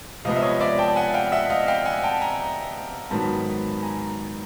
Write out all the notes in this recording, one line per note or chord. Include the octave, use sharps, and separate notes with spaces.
C3 F3 G#3 B3 D#5 F5
E5
C#5 D#5
D5 E5
G5 A5
F#5 G#5
F5 G5
E5 F#5
D#5 F5
F5 G5
F#5 G#5
G5 A5
G#5 A#5
G#2 D#3 F#3 B3 A5 B5
G#5 A#5